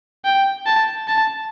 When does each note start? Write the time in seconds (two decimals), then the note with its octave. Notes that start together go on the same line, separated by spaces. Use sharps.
0.25 G5
0.66 A5
1.08 A5